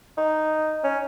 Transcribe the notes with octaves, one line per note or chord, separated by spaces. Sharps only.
D#4
C#4